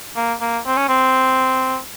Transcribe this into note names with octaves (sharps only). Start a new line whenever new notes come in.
A#3
A#3
C4
C#4
C4